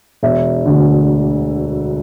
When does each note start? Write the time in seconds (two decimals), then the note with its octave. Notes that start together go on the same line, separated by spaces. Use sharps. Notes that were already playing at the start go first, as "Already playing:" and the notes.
0.23 E1 E5
0.65 D2 D3